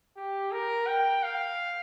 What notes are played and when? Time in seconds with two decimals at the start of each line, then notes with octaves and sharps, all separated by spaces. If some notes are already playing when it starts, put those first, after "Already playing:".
0.17 G4
0.52 A#4
0.87 G5
1.23 F5